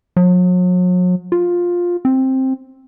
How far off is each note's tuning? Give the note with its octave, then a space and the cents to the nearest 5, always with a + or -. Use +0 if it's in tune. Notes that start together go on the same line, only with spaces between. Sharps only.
F#3 -40
F4 +10
C4 +10